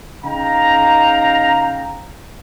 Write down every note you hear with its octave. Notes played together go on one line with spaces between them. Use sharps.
C#3 D#4 F5 G5 A#5